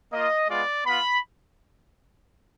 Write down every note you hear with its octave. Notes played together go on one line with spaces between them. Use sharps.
A#3 F4 D#5
G#3 B3 F4 D5
B3 F4 B5